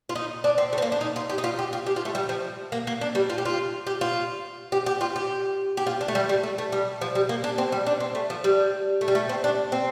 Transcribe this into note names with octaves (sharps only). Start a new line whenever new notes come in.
F4
D#4
D4
C4
A3
C4
A#3
D4
D#4
F4
G4
D#4
F4
G4
F4
G4
F4
A3
G3
F3
A#3
A#3
D4
G3
F4
G4
F4
G4
F4
G4
G4
F4
G4
G4
F4
D4
A3
G3
G3
A3
A3
G3
F3
G3
A#3
D4
C4
G3
D4
C4
A3
F3
G3
A3
G3
A3
C4
D4
C4